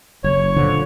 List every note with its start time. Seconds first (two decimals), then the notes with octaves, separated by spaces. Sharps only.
0.24 F#1 C#5
0.56 A#2 D3 F3